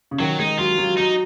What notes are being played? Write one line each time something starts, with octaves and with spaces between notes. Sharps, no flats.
C#3
D#3 F#3
G#3 D#4
F#3 F4
F#3
F#3 D#4